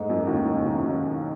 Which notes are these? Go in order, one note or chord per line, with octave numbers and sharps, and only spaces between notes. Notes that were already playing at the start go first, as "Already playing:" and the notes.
Already playing: G#2 G#3 A3
F#2 F#3
D#2 D#3
D#3
C#3
B2
C#2 C#3